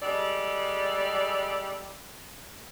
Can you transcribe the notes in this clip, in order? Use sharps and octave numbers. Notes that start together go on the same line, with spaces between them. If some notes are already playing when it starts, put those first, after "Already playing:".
G3 G#3 A4 D5